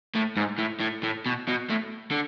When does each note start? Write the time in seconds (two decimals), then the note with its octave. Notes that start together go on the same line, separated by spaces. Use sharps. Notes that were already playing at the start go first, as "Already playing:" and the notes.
0.15 A2
0.37 G#2
0.59 A2
0.80 A2
1.04 A2
1.26 B2
1.48 B2
1.70 A2
2.11 D3